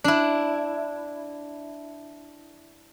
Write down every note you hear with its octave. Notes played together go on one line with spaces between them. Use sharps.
D4 E4